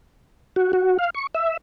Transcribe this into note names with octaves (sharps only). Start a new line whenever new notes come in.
F#4
F#4
F5
C#6
E5